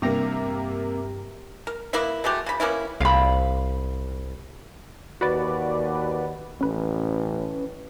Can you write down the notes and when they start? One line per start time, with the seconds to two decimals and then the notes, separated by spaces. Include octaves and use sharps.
0.02 G2 C3 A#3 G4 A#5
1.67 A#4
1.93 A#3 B3 E4 E5
2.24 G#3 A3 F#4 G4
2.46 C#3 B5
2.60 A#3 B3 C#4 E4
3.00 C2 F5 B5
5.21 D#2 F#4 B4 D5
6.61 A1 C#4 B4